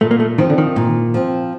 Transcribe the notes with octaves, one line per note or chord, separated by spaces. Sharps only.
A#2 A3
A#3
A3
D#3 F3 C4
D3
D#3
A#2
F3 C4